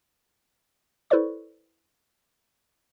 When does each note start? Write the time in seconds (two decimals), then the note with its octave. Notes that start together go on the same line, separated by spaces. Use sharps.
1.10 E4 A4 B4 C5 D5 C#6